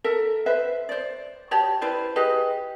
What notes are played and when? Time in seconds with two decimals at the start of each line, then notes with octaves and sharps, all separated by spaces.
0.04 A4 A#4 E5
0.46 B4 C5 E5
0.89 C5 D5
1.51 F#4 G4 C#5 A5
1.81 E4 B4 C5 D5
2.16 G4 G#4 B4 D#5